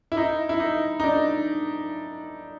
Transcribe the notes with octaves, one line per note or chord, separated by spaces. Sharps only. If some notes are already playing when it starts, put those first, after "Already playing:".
E4
D#4
E4
D#4
D#4
D4